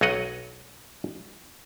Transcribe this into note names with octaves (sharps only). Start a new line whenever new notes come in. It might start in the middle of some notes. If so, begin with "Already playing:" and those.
B1 F#3 C#5 D#5 F#5